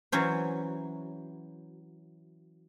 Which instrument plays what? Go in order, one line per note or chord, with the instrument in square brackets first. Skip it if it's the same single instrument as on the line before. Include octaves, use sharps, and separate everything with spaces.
[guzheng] E3 F#3 C#4 C5